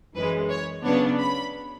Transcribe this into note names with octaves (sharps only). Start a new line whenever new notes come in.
F#2 E3 G#3 B4
C#5
C#3 F#3 B3 D4 C#5
B5